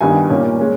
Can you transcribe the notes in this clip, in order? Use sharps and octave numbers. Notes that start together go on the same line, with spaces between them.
G2 D#3 G3 B3 G#5
A#2 A#3 C#4
G#3 C#4